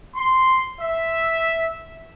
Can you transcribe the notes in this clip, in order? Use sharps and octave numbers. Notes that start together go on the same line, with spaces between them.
C6
E5